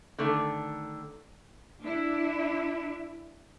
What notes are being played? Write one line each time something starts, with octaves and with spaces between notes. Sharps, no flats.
D3 D#3 A3
D4 E4